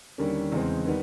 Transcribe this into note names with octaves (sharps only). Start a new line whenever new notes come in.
D#2 D3 G3 A#3 C#4
E2 C#3 E3 G#3 C4
D#3 G3 B3